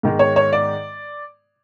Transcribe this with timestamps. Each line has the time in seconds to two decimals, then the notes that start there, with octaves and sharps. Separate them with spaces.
0.03 G#2 D#3 G#3
0.19 C#5
0.36 C#5
0.53 D5